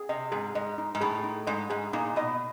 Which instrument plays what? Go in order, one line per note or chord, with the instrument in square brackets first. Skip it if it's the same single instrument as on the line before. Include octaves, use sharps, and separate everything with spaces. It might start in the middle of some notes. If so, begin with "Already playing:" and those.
Already playing: [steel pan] G#4
[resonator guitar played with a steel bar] C3 [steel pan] D#5
[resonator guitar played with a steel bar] G#2 [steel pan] G#4
[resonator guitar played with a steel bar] G#2 [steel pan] D#5
[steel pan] D#4
[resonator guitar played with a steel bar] G#2
[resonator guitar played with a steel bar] A2 [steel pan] G#4
[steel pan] D#4
[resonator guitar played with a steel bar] G#2 [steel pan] D#5
[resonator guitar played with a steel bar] G#2 [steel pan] G#4
[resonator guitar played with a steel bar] A#2 [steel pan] D#4
[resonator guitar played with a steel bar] B2 [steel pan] D#5